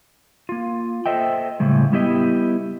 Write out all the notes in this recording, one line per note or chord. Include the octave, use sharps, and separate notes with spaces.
A#3 F4
A4 C5 D#5 E5 G5
A2 C#3 G3 G#3
G3 B3 E4 G4 D#5 E5